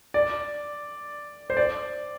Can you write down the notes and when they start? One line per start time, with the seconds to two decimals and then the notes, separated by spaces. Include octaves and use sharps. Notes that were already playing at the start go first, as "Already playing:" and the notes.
0.14 D5
1.50 C5
1.57 D5